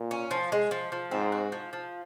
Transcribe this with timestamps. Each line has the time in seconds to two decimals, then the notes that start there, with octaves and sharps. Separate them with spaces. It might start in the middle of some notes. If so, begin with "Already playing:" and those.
Already playing: A#2
0.11 C#4
0.31 F3
0.52 G#3
0.71 F3
0.92 F3
1.11 G#2 C4
1.32 F#4
1.52 F3
1.73 F3